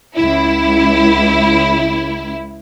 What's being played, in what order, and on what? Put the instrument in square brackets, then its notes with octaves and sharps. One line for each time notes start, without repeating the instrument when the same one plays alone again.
[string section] C#2 E4